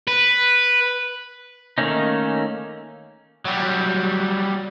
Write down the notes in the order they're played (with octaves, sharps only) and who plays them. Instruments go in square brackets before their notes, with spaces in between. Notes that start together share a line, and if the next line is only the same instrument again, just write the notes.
[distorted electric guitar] B4
[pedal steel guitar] D#3 A3 A#3 C#4 D#4
[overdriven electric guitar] F#3 G3